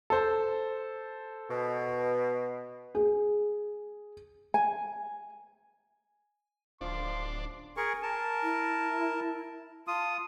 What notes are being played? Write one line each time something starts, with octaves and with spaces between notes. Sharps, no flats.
A4 C5
B2
G#4
G#5
D1 F3 D4 C6
G#4 A#4 G#5 C#6
A#4 A5
E4
F4 A5 D#6